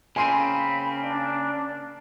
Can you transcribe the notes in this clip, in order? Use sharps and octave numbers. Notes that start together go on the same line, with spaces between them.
C#3 A#3 C4 C#4 G#5 B5 C6 D#7
D4